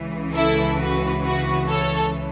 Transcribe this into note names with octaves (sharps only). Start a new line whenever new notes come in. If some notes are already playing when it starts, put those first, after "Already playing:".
Already playing: C#2 C#3 E3
E4 A4
F#4 B4
F#4 B4
A4 C#5